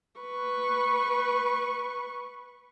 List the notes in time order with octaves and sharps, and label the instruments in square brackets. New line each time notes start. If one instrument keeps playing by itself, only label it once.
[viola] B4 C#6